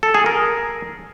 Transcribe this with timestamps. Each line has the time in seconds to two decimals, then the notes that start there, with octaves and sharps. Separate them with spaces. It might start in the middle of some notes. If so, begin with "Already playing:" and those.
0.03 A4
0.14 G#4
0.26 A#4